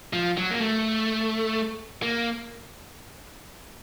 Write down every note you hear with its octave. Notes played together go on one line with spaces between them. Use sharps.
F3
F#3
A#3
A3
A#3